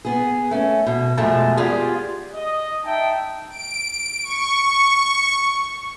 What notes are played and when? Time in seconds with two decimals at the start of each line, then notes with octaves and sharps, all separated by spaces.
0.05 B3 G#4
0.51 A3 C#4
0.86 B2
1.17 F2 B2 F3 G#3 A3 A5
1.57 B3 F4 G4 G#4 D5
2.34 D#5
2.84 D#4 E5 G5 A5
3.50 D7
4.23 C#6